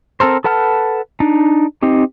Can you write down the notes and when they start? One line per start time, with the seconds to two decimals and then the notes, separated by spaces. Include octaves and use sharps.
0.20 C4 A4 A#4 C5
0.44 A4 B4 F#5 A5 F6
1.20 D4 D#4
1.83 C4 D#4 G4